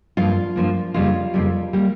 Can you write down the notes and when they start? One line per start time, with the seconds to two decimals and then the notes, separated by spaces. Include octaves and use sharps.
0.17 G2 F3 A#3 F4
0.56 G2 F3 A#3
0.94 F2 C#3 G3 A#3 F4
1.34 F2 C#3 G3 A#3
1.73 G3 A#3